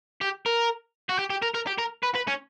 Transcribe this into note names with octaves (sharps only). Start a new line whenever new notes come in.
G4
A#4
F#4
G4
G4
A#4
A#4
G4
A#4
B4
B4
C#4